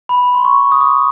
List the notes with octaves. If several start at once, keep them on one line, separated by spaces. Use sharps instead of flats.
B5
C6
C#6
D#6
D6